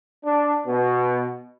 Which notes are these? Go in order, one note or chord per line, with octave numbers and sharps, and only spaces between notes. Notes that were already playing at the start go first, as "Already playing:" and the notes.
D4
B2